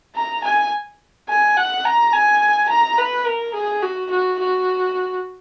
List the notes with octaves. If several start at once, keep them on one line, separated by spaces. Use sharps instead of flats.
A#5
G#5
G#5
F#5
A#5
G#5
A#5
B4
A#4
G#4
F#4
F#4
F#4